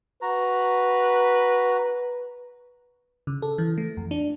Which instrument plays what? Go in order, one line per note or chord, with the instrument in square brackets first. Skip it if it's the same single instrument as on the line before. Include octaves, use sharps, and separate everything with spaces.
[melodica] F#4 A#5 [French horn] B4
[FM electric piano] C#3
A4
E3
A3
F2
D4